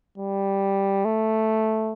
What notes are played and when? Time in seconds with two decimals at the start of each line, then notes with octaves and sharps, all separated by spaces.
0.18 G3
1.05 A3